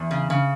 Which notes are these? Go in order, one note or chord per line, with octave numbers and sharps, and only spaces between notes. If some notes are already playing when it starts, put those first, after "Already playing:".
Already playing: E2
C#3
C#3